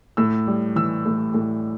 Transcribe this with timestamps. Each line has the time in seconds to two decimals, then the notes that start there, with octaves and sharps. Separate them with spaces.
0.17 A2 E6
0.47 G3
0.76 E3 E6
1.06 A2
1.34 A2